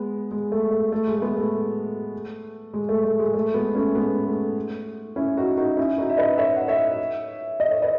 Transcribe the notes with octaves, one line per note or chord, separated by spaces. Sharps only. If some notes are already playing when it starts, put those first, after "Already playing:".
Already playing: G#3 B3
G#3
A3
A3
A3
G#3
A3
G#3 B3
A3
G#3
A3
A3
G#3
A3
G#3 B3
A3 C#4
G#3 B3
A3
C#4 E4
D#4 F#4
D#4 F#4
C#4 E4
D#4 F#4
E5
B4 D#5
C#5 E5
F#5
C#5 E5
D#5
C#5
B4 D#5